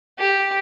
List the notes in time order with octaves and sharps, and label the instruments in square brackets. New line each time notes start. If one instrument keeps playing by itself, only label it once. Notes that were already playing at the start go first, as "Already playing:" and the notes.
[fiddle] G4